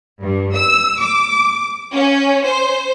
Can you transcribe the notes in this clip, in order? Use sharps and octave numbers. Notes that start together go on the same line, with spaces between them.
G2
E6
D6
C#4
C5